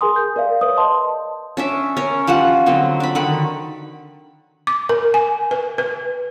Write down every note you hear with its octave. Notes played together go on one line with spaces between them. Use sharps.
G#4 A#4 G#5 C6 D#6
G6
A#4 D5 E5 F5
B4 C#5 D#6
D#5 A5 C6
C#4 D4 E5
C#4 A#4
F3 G3 F#4 F#5
D3 F#3 C4 D#5
D4 B5
D3 D#3 F#5 B5
D6
A#4
G#5
B4
B4